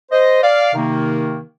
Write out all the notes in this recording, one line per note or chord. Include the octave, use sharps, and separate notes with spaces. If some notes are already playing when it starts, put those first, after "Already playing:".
C5 D#5
D5 F5
C3 D#3 A#3 D#4